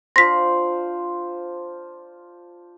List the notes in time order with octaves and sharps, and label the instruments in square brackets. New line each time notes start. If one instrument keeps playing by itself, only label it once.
[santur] D4 F4 C5 [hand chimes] C6 [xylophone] A#6 B6